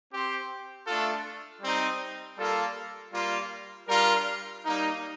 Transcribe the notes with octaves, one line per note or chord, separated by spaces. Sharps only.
C4 G4 C5
A3 D4 F4 A4
G3 C4 D#4
G3 A#3 F4 A4
G3 A#3 F4
G3 D4 F4 A#4
G3 A#3 D#4